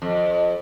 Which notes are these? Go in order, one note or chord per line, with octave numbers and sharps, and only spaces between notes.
F2